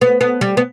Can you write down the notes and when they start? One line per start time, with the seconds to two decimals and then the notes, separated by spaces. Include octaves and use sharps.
0.01 B3
0.21 B3
0.41 G3
0.57 B3